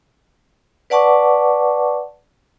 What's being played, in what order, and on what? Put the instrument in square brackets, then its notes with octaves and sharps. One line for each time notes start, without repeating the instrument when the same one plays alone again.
[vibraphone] B4 D5 F#5 A5 C#6 D6